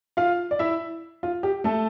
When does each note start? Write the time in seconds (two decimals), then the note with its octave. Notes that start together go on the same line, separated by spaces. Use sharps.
0.17 F4 F5
0.51 D5
0.59 E4 E5
1.23 F4
1.43 G4
1.64 A3 A4